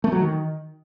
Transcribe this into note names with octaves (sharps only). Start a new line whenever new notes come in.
A3
F#3
D#3